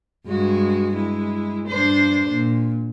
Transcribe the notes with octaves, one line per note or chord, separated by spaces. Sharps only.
G2 G#3 F#4
G#3 E4
G2 D4 C5
A#2